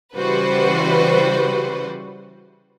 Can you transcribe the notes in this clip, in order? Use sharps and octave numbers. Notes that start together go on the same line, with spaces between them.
C#3 E3 G3 F#4 B4 C5